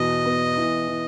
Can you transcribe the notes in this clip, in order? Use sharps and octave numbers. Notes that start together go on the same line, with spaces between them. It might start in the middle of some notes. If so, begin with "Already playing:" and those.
Already playing: E2 B2 B3 D#5
B3
E3
E3